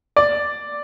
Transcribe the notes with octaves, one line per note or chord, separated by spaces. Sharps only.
D5